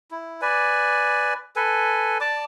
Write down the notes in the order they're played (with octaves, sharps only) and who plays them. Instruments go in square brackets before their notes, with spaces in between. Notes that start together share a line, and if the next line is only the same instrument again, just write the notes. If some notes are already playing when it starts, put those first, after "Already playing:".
[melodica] E4
B4 D5 G#5
A4 B4 G#5
D5 A5 D6